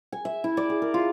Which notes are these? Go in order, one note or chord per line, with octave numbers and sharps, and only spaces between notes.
G#5
E5
E4
D5
G#4
A#4
F4